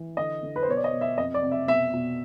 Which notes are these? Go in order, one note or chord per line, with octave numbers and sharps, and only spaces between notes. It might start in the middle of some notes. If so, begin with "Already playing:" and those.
Already playing: E3
D3 D#5
D3
B4
C5
B2 C#5
D5
D#5
B2
E5
F2 D#5
D5
C3
E5
B2 E5
B2